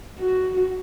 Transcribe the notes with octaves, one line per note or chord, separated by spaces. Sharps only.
F#4